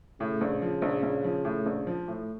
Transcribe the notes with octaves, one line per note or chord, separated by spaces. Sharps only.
A2 C#3
A#1
F3
A#1
A#1
F3
A2
A#1
F3
A2